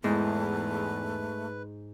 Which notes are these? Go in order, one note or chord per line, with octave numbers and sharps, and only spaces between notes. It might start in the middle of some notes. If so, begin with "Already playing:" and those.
E2 G#2 A3 B4